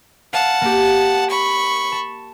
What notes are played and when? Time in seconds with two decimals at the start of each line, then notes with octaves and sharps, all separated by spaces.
0.33 F5 F#5 A5
0.61 A#3 G4
1.29 B5 C#6
1.92 A5